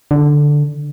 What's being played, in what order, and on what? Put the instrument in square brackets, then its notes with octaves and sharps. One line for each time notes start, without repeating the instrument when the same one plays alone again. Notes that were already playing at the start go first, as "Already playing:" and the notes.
[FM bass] D3